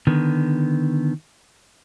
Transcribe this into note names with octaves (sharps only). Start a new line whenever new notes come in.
D3 D#3 B3